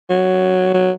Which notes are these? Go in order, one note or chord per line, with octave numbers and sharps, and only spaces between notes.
F#3
F#3